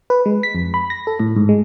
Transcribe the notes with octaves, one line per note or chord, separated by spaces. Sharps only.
B4
G#3
B6
F2
B5
A#6
A4
A2
G#2
G#3